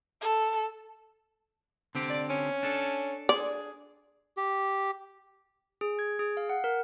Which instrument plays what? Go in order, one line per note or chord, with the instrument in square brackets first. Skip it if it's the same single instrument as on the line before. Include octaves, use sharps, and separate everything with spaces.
[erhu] A4
[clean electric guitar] D3 C4 G4
[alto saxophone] D5
C#4
[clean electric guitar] D4 A4
[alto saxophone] G#4 [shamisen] D5
[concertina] G4
[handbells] G#4
G#6
G#4
F5
F#5
A#4